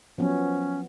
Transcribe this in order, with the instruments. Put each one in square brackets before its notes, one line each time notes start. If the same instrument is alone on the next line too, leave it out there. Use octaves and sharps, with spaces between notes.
[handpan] F3 F#3 B3 [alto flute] C#4